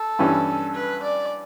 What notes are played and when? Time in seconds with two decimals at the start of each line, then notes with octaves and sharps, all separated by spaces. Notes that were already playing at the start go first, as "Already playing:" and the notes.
Already playing: A4
0.19 G2 E3 G3 C#4
0.75 B4
1.03 D5